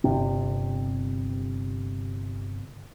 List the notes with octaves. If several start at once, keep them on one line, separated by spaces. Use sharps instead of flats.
G1 C3 C4